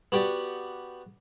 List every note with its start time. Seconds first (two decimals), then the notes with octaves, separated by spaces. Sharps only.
0.12 B3 F#4 G4 D5